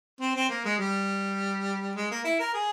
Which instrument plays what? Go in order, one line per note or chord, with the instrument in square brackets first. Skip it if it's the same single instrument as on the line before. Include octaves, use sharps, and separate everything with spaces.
[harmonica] C4
C4
A#3
G#3
G3
G#3
A#3
E4
A#4
G#4